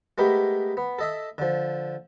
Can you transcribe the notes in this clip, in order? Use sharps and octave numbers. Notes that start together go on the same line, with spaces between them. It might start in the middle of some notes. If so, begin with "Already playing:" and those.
G#3 A3 B3 G4 A#4
B3
A4 D#5 E5
D3 F3